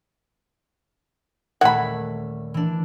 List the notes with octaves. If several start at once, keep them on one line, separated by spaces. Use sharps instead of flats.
D#1 A3 F#5 B5 G#6
E3 D4